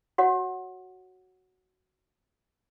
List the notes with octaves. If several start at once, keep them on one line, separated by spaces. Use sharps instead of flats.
F#4 C#5 F#5